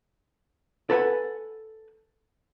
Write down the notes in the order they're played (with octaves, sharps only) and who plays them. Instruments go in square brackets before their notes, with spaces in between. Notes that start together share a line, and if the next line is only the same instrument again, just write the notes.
[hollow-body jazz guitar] A4 B4 F#5 G#5